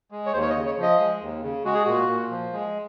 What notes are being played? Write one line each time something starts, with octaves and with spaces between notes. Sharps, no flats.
G#3
C#5
D#2 C5
C#5
D#5
C#3
C#5
F3
D#5
G#3
D#2
C#3
G#3 F#4
G#4
A#2 F#4
A#2
F3
G#3